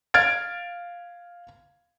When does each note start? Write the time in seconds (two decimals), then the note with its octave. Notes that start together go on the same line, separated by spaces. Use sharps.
0.14 F5 F6 G#6 A6 D7